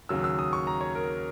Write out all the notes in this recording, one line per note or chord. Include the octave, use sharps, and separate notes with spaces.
D#2 C#3 F#3 E6
E6
D#6
C#6
A#5
C#5
A#4